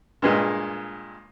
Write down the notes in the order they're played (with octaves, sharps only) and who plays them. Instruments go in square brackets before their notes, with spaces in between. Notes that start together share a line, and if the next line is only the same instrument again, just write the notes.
[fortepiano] G2 A#2 G#3